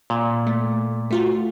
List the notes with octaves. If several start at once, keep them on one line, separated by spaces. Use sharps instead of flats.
A#2
A3
A3 F4 F#4